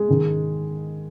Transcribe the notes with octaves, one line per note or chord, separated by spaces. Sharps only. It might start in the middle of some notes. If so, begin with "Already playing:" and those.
Already playing: G#3
G#2 D#3